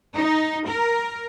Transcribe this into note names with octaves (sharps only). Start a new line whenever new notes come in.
D#4
A#4